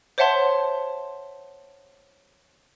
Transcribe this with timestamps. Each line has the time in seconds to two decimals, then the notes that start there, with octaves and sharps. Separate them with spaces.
0.18 C5 C#5 E5 F#5 A5 C6